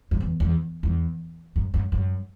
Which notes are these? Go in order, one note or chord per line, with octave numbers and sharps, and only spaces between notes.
F#2
E2
E2
E2
F#2
F#2
F#2